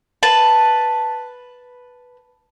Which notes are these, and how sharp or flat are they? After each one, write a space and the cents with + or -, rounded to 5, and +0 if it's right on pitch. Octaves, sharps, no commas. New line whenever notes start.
B4 +0 A5 +0